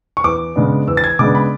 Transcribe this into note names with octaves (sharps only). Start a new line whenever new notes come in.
C#6
E2 D6
C#3 G#3 B3 D4
E2 E6
A6
G#6
C#3 G#3 B3 D4 D6
B5